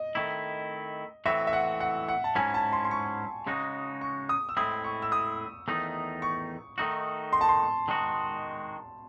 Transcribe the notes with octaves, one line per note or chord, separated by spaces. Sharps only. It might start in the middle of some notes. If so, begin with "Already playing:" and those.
Already playing: D#5
D#3 A3 C4 E4
A2 E3 C4 F#4 E5
E5
F#5
F#5
F#5
A5
G#2 F#3 C#4 E4 G#5
A5
C6
C6
C#6
C#3 G#3 D#4 F#4
C#6
D#6
E6
A2 G#3 C4 E4 D#6
C#6
E6
D#6
E2 D#3 A3 D#4
C#6
D#3 A3 D#4 F#4
C6
A5
C6
D#3 G#3 D#4 F#4